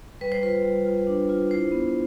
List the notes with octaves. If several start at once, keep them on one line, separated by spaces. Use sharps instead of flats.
G3 B4
C5
F4 B4
G3
F4
D4
F4
E4 C5
B3